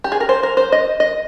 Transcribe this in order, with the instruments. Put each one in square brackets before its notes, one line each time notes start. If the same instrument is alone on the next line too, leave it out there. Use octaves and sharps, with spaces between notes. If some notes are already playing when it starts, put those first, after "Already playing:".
[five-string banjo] G4
G#4
A#4
C5
A#4
C5
D#5
D#5